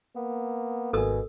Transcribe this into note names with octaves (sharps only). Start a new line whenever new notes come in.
A#3 B3
G#1 G#2 B2 A4 A#4 G#5 D#6